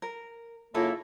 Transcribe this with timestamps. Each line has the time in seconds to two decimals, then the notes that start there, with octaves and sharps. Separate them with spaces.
0.02 A#4
0.74 F#2 C#3 A#3 E4 F4 A4